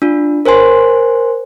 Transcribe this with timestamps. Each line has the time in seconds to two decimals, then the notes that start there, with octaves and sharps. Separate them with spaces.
0.02 D4 F4
0.46 A#4 C5 C#5 G#5 C6